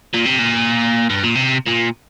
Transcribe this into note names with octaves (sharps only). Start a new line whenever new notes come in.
A#2
C3
A#2
G2
A#2
C3
A#2